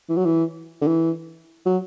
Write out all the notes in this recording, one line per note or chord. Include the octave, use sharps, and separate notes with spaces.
E3
F#3
E3
D3
E3
F#3